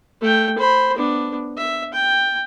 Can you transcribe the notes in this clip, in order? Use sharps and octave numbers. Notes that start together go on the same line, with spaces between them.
A3 G5
C5 B5
B3 D4
E5
G5